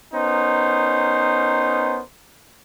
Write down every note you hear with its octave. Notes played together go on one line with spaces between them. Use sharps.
B3 C#4 D#4 A#4 C5